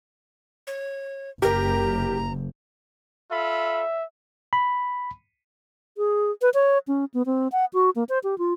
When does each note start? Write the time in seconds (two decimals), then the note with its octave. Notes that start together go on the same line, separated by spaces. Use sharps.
0.67 C#5
1.42 F#1 G4 A#4 A#5
3.31 F4 A4 E5 B5
4.53 B5
5.98 G#4
6.42 B4
6.54 C#5
6.88 C#4
7.14 B3
7.26 C4
7.52 F#5
7.74 F#4
7.96 A#3
8.09 C5
8.24 G4
8.38 F4